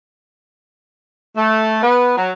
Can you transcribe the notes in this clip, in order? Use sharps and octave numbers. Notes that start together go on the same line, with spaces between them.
A3
B3
F#3